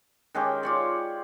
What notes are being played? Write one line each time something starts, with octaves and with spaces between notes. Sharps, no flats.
D#3 G#3 C#4 G4
F4 C#5 D5